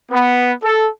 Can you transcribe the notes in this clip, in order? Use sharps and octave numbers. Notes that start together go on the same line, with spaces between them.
B3
A4